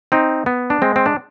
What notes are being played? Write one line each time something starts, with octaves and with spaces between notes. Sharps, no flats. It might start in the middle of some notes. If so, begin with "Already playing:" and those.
C4 D#4
B3
D4
G#3 C4
C4
D4